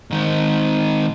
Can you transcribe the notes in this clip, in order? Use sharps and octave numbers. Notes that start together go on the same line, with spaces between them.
G#2 D#3